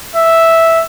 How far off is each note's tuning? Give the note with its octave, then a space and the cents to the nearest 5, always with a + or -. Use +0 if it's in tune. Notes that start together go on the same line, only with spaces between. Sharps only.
E5 -5